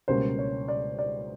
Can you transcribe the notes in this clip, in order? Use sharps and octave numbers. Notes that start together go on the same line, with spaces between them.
C#2 B2 G3 A#3 C#4 C5
C#5
D5
D5